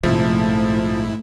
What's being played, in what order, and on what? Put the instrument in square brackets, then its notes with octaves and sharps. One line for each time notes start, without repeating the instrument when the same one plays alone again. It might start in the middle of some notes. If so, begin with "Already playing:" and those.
[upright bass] A#1 C3 [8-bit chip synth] G#2 E4 [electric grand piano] F3 [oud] A3